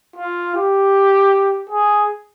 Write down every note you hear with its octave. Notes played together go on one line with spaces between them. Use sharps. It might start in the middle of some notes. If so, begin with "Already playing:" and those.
F4
G4
G#4